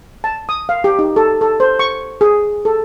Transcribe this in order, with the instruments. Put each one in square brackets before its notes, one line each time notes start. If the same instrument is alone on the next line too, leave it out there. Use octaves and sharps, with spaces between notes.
[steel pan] A5
D#6
F5
G4
D#4
A4
A4
C5
C#6
G#4
A4